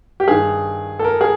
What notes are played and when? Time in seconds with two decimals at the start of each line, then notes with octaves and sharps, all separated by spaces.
0.20 G4
0.28 G2 D#3 G#4
0.99 A4
1.04 A#4
1.21 G#4